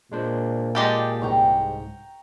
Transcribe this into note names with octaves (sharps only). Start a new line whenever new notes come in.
A#2 G#3 D4 C5
G#3 G4 A4 D5 D#5 G5
C2 G#2 G5 A#5 C#6